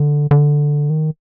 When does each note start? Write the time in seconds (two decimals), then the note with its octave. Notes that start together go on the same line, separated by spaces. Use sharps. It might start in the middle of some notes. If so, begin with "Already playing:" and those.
Already playing: D3
0.31 D3
0.90 D#3